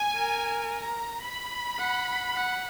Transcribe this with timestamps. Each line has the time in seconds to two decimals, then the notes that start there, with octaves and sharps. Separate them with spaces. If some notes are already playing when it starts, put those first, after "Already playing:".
Already playing: G#5
0.16 A#4
0.69 A#5
1.24 B5
1.78 F#5
2.33 F#5